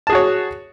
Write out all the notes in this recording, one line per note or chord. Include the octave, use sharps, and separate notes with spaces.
F#4 G#4 C#5 A5